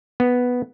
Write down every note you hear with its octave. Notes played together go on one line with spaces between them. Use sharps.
B3